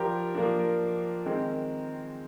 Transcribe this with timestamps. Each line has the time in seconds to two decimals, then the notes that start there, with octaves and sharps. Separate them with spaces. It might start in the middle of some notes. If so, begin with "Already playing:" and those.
Already playing: F3 D4 G4 A#4 C5
0.35 F3 A#3 D4
1.25 D#3 G#3 C4